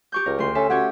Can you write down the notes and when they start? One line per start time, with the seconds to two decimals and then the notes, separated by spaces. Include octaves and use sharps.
0.12 G4 C#6 G6
0.26 C#2 A#4
0.39 D2 C6
0.55 C#4 A4 E5
0.70 C#4 F#4 G4 C#5